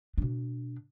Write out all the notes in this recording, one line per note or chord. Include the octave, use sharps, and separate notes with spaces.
B2 D4